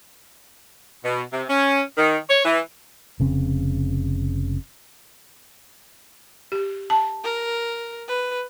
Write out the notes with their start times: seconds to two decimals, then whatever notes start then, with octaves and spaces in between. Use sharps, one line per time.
1.05 B2
1.33 C3
1.49 C#4
1.97 D#3
2.30 C#5
2.45 E3
3.20 F1 C#3 C4
6.52 G4
6.90 A5
7.24 A#4
8.08 B4